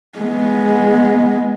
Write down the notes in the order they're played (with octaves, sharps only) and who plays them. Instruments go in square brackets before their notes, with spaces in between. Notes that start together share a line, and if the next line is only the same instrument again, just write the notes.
[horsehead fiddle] G#3 B3